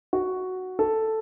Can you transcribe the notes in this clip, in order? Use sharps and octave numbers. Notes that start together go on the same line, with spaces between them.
F#4
A4